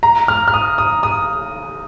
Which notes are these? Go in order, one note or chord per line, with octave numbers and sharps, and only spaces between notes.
A#5
F6
F6
D#6
D#6
D#6